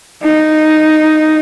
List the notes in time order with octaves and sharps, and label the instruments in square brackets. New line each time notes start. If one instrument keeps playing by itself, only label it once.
[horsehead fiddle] D#4